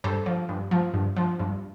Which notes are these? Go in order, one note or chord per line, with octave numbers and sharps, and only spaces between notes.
G2 A4 C5
F3
G2
F3
G2
F3
G2